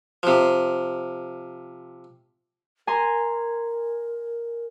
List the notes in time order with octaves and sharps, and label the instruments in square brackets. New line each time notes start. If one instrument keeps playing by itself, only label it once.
[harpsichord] C3 F3
[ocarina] A#4 [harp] G#5 A#5 C6